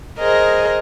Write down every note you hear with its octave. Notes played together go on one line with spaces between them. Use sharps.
G#4 A#4 C5 D#5